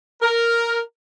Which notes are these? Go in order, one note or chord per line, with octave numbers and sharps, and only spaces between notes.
A#4